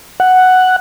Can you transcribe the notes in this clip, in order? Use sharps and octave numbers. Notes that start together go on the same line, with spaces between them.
F#5